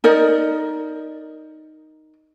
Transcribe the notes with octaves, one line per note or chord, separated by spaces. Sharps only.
D#4 A#4 D5 D#5